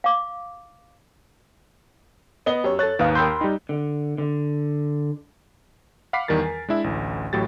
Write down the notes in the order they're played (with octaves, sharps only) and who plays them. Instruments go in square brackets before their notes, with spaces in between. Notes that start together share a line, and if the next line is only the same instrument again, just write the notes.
[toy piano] F5 D6
[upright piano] B3 D#5 G7
[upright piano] F#2 [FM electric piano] G4 C#5
[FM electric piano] A4 C#5 [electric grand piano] F#6 A6
[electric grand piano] D#2 D#6 [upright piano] G#2 [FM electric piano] B4 F5
[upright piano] A#4 E6 G6 [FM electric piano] G5 B5 C6
[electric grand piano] G3 D#4
[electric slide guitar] D3
D3
[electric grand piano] F5 F#5 B5 D6 B6 C7
E2 D#3 G3 A#4 A6
A#4 G#5
G#3 D4 E4 E5
A1 D2
A1 A2 F#3 G4 A6